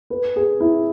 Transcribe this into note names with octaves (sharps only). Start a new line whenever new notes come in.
B4
G#4
E4